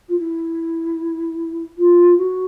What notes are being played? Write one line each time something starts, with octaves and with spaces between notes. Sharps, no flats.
F4
E4
F4
F#4